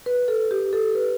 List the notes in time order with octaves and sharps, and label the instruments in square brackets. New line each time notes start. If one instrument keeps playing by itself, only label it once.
[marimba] B4
A4
G4
A4
B4